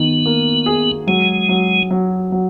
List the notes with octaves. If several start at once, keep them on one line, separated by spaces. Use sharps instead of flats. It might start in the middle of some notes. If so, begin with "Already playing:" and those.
Already playing: D#3 B3
A#3
G#4
F#3 G#3
F#3
F#3
F#3